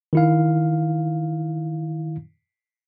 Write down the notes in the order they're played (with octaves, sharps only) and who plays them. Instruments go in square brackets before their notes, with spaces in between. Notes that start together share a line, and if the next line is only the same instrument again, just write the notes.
[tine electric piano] D#3 E4 F5